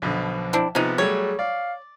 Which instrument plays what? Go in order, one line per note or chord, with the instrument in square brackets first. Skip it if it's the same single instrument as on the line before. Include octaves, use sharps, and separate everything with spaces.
[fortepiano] B1 B2 D3 [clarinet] F3
[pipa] C4 D4 E4
[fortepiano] C3 F3 B3 [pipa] G#3 D#4
[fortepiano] F#3 G3 A3 [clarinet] G#4 [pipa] C#5
[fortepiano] D5 [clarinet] F5